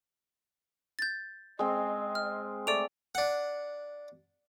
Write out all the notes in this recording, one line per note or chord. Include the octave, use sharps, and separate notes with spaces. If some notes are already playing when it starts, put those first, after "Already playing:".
G6 A6
G#3 C4 D#5
F6
A3 D5 D6 D7 F7
D4 F#5